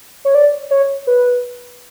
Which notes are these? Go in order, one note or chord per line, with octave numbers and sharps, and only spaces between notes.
C#5
D5
C#5
B4